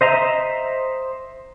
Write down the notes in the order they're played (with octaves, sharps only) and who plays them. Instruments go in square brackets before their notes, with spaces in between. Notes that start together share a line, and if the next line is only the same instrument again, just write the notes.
[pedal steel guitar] C5 D#5 E5 A#5